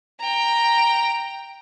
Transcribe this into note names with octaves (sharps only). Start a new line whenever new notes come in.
G5 A#5